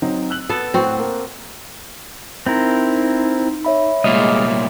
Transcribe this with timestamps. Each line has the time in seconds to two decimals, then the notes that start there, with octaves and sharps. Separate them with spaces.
0.02 F#3 C4 D#4
0.30 E6 F#6 F#7
0.49 B3 A4
0.74 A2 C4 F#4
0.99 A#3
2.46 C4 D#4 E4 A#4
3.65 C#5 E5 B5
4.04 C2 A#2 G#3 D#5 F5